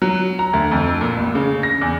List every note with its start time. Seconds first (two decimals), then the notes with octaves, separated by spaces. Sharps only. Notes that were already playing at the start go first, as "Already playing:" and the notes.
0.02 F#3
0.39 A#5
0.53 D2
0.71 F2
1.01 A#2
1.17 A1
1.35 C#3
1.63 A#6
1.81 E2